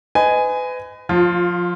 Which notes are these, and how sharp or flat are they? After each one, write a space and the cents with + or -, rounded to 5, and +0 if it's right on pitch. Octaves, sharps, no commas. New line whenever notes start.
B4 +35 D#5 +0 G#5 +0
F3 +25 F4 +0